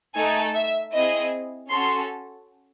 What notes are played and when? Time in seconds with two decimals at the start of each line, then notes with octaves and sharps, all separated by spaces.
0.15 A3 D#4 A4 G#5
0.54 E5
0.93 C4 E4 G#4 D#5
1.70 C#4 F#4 A4 C6